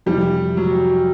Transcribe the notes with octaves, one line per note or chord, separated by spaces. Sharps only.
F2 C3 E3 G3
F#3